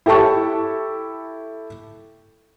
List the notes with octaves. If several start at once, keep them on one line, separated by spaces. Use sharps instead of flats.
E4 G4 A4 A5 C#6